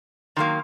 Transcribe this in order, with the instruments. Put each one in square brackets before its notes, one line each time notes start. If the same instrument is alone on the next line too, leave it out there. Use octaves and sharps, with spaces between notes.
[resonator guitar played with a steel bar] D#3 F#3 A#3 [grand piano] C6